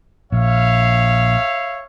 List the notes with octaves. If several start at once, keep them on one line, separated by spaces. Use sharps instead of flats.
A#1 C#5 E5 F5